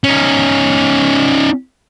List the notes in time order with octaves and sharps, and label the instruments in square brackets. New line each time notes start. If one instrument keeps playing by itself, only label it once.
[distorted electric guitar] C#4 D#4